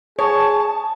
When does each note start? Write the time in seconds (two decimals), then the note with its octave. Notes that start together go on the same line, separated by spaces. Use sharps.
0.19 G#4 C#5 A5